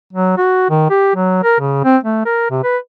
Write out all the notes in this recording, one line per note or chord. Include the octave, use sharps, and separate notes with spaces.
F#3
F#4
D#3
G4
F#3
A#4
C#3
C4
A3
A#4
C3
B4